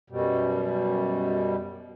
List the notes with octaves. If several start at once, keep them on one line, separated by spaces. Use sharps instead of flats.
F#2 B2 G3